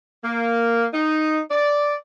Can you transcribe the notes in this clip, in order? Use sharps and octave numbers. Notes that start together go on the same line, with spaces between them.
A#3
D#4
D5